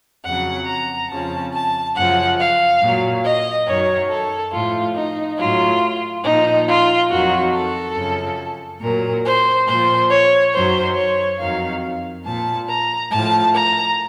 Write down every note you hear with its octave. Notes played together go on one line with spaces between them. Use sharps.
F2 C#3 F#3 F#5
A#5
F2 C#3 F3 A5
A5
F#2 C#3 F3 F#5
F5
A#2 F#3
D#5
F#2 D#3 F#3 C#5
A4
A2 F3 F4
D#4
A2 F#3 F4
A#2 F3 D#4
F4
F2 D#3 F#3 F#4
A4
F#2 C#3 F3
A#2 F#3 A#4
C5
A#2 F3 C5
C#5
F#2 D#3 F#3 C5
C#5
F2 D#3 F#3 F5
A#2 F3 A5
A#5
A2 F3 A5
A#5